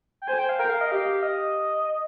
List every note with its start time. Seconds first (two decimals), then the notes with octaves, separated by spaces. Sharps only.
0.22 G5
0.27 C5 G#5
0.38 G5
0.49 F5
0.59 A#4 G5
0.69 F5
0.81 D#5
0.91 G4 F5
1.23 D#5